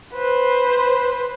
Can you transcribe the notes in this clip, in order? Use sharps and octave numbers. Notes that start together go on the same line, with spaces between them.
B4 C5